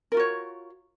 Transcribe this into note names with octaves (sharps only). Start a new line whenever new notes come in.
F4 F#4 A#4 C#5